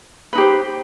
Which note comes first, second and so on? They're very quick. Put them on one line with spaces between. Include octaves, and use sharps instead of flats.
B4 D#4 G4 C5